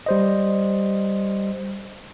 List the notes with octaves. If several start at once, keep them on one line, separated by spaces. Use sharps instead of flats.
G3 C5 D#5